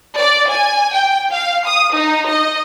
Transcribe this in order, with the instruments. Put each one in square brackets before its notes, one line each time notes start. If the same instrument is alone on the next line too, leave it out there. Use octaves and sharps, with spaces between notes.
[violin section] D5
G#5
G5
F5
D#6
D#4
D#5